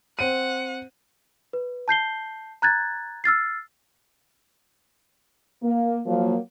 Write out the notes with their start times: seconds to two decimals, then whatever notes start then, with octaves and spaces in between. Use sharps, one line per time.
0.19 C4 F#5 D#7
1.53 B4
1.88 A5 G6 C7 G7
2.62 A#5 F#6 G#6 A6
3.24 E6 F6 A6 C7
5.63 A#3
6.06 F3 F#3 A#3